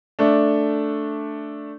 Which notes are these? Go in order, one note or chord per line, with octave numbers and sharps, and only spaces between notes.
A3 D4